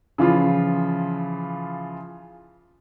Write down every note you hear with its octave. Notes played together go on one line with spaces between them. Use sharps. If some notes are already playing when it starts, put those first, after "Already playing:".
C#3 E3 F3 F4